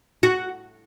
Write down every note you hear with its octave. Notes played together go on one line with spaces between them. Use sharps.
F#4